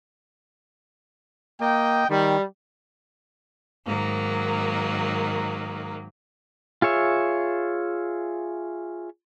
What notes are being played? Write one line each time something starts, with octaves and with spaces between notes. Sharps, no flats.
A#3 D#5 G5
D#3 G3
G#2 D#3 F#3 A#3
F4 G#4 C#5 E5